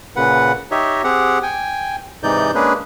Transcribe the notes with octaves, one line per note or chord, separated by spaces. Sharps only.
A#2 C#3 B4 F#5
D#4 G4 C#5 D#5 E5
C4 G4 G#4 F#5
G5 G#5
G#2 C3 E3 D#4 D5 G6
G#3 A#3 C#4 D4 G#4 B4